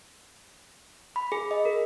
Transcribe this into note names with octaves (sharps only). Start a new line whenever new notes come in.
B5
G#4
D#5
A#4